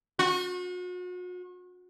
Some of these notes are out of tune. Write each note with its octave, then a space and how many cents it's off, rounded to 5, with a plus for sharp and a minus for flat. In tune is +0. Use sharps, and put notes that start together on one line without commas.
F#4 -40